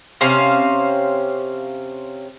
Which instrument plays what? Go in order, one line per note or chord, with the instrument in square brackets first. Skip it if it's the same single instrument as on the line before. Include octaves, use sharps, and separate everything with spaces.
[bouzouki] C3 C#4 C5 F5